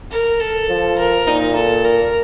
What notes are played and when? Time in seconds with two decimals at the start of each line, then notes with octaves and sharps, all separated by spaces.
0.11 A#4
0.40 A4
0.69 F3
0.98 A#4
1.26 A#2 D#4
1.55 A4
1.84 A#4